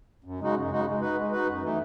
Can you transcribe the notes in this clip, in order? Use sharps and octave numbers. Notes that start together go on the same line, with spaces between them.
F#2
C#3 G#3 D#4 F#4
F#2
C#3 G#3 D#4 F#4
G#3
D#4 F#4 B4
G#3
D#4 F#4 B4
F#2
E3 A3 D#4